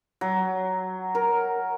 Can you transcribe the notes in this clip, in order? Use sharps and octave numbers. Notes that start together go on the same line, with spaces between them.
F#3
A#4